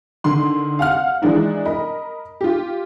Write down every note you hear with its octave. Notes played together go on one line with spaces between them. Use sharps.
D3 D#3 C6
F5 F#5 F6
D#3 E3 G#3 D4 D#4
A#4 D#5 B5
F4 G4